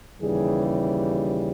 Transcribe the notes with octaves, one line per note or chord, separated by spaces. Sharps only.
D#2 C#3 E3 G3 G#4